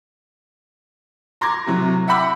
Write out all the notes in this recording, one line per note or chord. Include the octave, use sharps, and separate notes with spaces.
A#5 C6 D6 G#6 A#6
A2 C3 F#3
E5 F#5 G5 B5 D6 E6